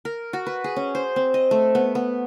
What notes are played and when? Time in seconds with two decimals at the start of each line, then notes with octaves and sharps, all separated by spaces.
0.05 A#4
0.33 F#4
0.47 B4
0.64 G#4
0.76 C#4
0.95 C5
1.16 C4
1.34 D#5
1.51 A3
1.75 B3
1.95 B3